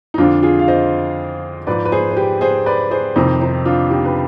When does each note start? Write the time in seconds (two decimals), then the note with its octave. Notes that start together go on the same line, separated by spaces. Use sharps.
0.14 D#4
0.18 F2 D3 F3 D4 F4
0.43 F4 G#4
0.59 F5
0.68 C5 D#5
1.67 G#2 F3 B4 D5
1.85 B4
1.92 G#4 C5
2.11 C5
2.17 G4 B4
2.41 G#4 C5
2.66 B4 D5
2.91 G#4 C5
3.16 F2 C3 D#3 C4 D#4
3.41 C4 D#4
3.66 D4 F4
3.90 D#4 G4
4.05 B4